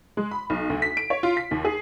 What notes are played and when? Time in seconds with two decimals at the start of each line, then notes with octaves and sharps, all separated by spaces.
0.17 G#3
0.31 B5
0.50 B1
0.70 D2
0.82 B6
0.97 D7
1.10 C#5
1.23 F4
1.37 B6
1.51 D#2
1.65 G#4